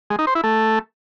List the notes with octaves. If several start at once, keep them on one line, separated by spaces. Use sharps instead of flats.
G#3
D#4
C5
E4
A3